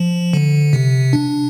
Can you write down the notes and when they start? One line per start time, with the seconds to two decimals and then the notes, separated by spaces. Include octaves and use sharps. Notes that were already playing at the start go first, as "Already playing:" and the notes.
Already playing: F3
0.33 D3
0.73 C3
1.13 D4